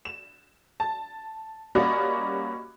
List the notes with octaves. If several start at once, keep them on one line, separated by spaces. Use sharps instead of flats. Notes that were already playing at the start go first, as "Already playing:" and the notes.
E7
A5
G3 A#3 C#4 F#4 D5 D#5